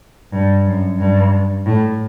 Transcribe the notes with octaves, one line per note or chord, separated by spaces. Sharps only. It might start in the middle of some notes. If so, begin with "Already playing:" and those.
G2
F#2
G2
A2